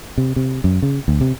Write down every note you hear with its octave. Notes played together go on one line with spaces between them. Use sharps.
C3
C3
F#2
C#3
D2
C3